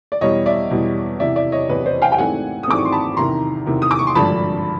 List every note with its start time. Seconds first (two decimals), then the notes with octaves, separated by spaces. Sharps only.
0.12 D5
0.21 E2 B2 G3 C#5 D#5
0.46 D5 E5
0.70 E2 B2 G3
1.20 E2 C3 E3 D5 E5
1.36 D5 E5
1.52 C#5 D#5
1.69 E2 C3 E3 B4 C#5
1.85 C5 D5
2.02 F5 G5
2.12 G5
2.18 G#1 G#2 E3 A3 C4 F#5 G#5
2.63 D#6
2.68 G#1 G#2 E3 A3 C4 D6
2.78 C#6
2.85 C6
2.92 A5 B5
3.17 E2 C3 D#3 A#5 C6
3.66 E2 C3 D#3
3.82 D#6
3.91 D6
3.99 C#6
4.07 C6
4.15 G#1 G2 D3 F3 A5 B5